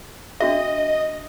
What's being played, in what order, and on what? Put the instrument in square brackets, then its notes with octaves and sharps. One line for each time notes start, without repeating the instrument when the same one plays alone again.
[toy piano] D4 F#4 E5 [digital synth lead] D#5